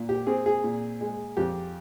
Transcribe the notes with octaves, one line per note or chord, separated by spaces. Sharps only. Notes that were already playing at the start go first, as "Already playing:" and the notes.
Already playing: A#2
G4
C4 G#4
G#4
A#2
G#3
F2 G4